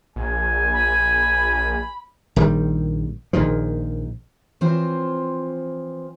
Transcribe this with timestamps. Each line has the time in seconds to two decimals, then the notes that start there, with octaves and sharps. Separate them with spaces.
0.16 A#1 G#5
0.72 B5
2.36 A#1 D#3 G3
3.33 A#1 A#2 D#3 F3
4.61 E3 F3 C4 F4 C5 C#5